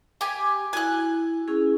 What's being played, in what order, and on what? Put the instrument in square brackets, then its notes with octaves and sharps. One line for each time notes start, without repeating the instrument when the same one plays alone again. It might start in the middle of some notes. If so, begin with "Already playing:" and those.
[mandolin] G4 G#5
[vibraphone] E4 F#4 [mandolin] G#5 F#6
[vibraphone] C#4 E4 G#4